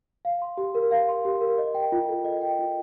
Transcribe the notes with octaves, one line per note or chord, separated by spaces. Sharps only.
F5
C6
G4
A#4
F5
C6
G4
A#4
D#5
G5
F4
A4
D#5
G5
F4